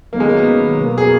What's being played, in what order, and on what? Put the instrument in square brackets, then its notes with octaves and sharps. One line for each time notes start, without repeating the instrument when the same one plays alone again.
[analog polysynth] D#3 F#3 B3 [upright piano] A#3
[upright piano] G#3
A#3
B3
[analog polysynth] B2 F#3 A#3
[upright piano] G#4